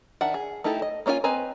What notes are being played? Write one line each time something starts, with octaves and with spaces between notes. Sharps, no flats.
D#3 D4 E5 F#5
G#4
A3 D#4 E4 G4 A4
D#5
A#3 C#4 F4 A4 G#5
C4 B4 D#5 G#5 A#5